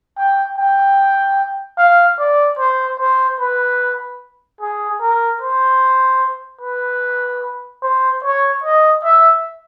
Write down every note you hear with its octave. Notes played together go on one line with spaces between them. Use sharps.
G5
G5
F5
D5
C5
C5
B4
G#4
A#4
C5
B4
C5
C#5
D#5
E5